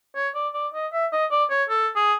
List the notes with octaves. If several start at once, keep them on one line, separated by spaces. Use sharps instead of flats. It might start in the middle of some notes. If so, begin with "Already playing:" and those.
C#5
D5
D5
D#5
E5
D#5
D5
C#5
A4
G#4